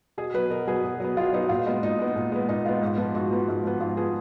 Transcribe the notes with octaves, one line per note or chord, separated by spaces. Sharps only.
B2 G#4
F#3 B3 B4
B2 A#4
F#3 B3 G#4
B2
F#3 B3
B2 F4
F#3 B3 D#4
A#2 F4
G#3 B3
A#2 D#4
G#3 B3
A#2
G#3 B3
A#2 D#4
G#3 B3 F4
G#2
F3 B3
G#2 F#4
F3 B3
G#2
F3 B3
G#2 F4
F3 B3 G#4